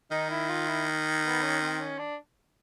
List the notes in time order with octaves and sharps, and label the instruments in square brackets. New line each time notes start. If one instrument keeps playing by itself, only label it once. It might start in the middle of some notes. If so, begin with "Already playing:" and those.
[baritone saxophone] D#3 [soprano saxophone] D#4
[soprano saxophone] E4
F4
E4
B3
C#4
C4
C#4
D4